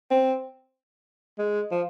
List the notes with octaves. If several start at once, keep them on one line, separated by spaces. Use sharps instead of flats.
C4
G#3
F3